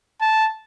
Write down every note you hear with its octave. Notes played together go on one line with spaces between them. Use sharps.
A5